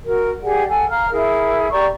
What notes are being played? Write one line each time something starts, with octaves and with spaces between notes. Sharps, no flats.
F#4 A#4
G4 G#4 D5 F#5
A4 F#5 G#5
F5 A#5 F6
E4 G#4 A#4
G4 D5 A#5 C#6